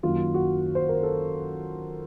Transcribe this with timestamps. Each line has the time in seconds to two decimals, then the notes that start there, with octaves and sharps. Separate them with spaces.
0.03 F#2 D#3 F#3 A#3 F4
0.34 F#4
0.75 C5
0.89 A#4
1.03 A4